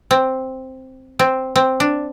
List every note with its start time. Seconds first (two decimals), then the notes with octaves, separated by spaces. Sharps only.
0.11 C4
1.19 C4
1.56 C4
1.80 D4